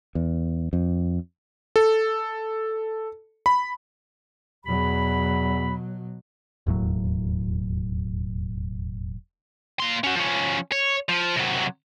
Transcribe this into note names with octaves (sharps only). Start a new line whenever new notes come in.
E2
F2
A4
B5
E2 B2 F#3 B5
E1 D#2 A2 F#3
A#3 C6
C#4 F#4
F3 C#4
C#5
F3
C3 F#3